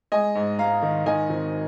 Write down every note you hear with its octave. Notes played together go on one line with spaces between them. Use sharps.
G#3 D#5 G#5
G#2
G#2 F5 A#5
D#3
D#3 D#5 G#5
G#1